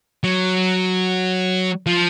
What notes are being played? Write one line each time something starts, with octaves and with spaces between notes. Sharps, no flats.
F#3
F3